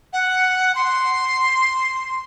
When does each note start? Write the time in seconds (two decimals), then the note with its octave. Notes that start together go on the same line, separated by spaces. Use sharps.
0.13 F#5
0.75 C6